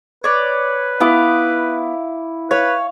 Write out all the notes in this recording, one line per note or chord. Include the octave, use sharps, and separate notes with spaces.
B4 C#5 D5
B3 E4 F5 D6
B4 C#5 F5